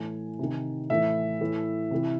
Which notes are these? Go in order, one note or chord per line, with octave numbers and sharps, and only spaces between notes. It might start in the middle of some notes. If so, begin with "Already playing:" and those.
Already playing: A2 E3 G#5
C3 D#3
A2 E3 E5
A2 E3
C3 E3